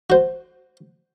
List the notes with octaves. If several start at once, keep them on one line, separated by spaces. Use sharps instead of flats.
F#4 C5